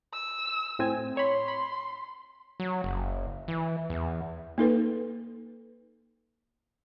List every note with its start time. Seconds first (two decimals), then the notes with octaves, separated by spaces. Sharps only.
0.13 E6
0.79 A2 C4 G#5
1.17 C#5 B5 C6
1.48 B5
2.60 F#3
2.84 F#1
3.48 E3
3.90 E2
4.58 A#3 D#4 A4 B4